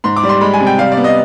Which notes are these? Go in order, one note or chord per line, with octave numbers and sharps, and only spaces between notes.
G#2 C6
D6
G3
C6
G#3 B5
G#5
C3
G5
G3 F5
D5
B3
D#5